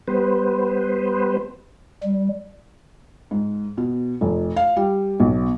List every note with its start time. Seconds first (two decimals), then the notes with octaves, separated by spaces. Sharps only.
0.08 G3 B3 B4 C5
2.04 G3
3.31 G#2
3.77 B2
4.21 F1
4.56 F5
4.76 G3
5.20 B1